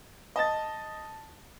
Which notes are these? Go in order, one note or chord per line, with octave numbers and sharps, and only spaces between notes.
D#5 A5 A6